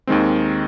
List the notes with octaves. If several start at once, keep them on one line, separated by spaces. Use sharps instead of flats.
D#2 D#3 G#3 C4